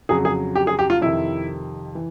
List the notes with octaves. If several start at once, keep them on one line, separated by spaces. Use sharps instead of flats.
F2 C#3 F#3 G#4
G#4
G4
G#4
G4
F4
F2 C3 D#3 E4
E3